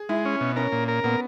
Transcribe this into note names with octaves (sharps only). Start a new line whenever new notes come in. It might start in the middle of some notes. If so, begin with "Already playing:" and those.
Already playing: G#4
G#3 E4
C#4
B2
C#4 A#4
A#2
A#4
A#2 B3